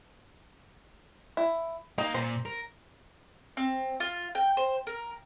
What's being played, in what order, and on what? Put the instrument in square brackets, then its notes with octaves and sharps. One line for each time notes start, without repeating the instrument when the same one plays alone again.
[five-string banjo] E4
[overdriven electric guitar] A#3 [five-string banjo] D#4
[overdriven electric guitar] A#2 [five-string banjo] C5
[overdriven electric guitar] A#4
[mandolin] C4
F4
G5
C5
A#4